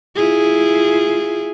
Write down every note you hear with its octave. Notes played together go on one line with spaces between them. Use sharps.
E4 F4 G#4